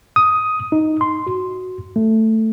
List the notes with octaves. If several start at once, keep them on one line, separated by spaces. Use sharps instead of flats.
D#6
D#4
C6
F#4
A3